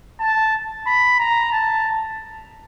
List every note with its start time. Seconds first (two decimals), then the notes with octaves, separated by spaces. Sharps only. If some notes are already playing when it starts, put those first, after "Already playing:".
0.20 A5
0.87 B5
1.19 A#5
1.52 A5